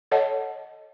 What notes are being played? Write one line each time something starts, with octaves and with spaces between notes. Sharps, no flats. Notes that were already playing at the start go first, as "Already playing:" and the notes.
A4 C#5 D#5 F#5 A5